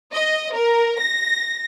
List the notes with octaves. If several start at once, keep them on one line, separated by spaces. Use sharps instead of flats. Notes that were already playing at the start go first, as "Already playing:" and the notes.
D#5
A#4
A#6